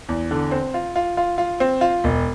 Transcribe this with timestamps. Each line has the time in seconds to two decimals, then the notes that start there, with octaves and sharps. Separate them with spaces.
0.09 E2
0.31 D3
0.51 C4
0.74 F4
0.96 F4
1.17 F4
1.38 F4
1.60 C4
1.81 F4
2.04 E1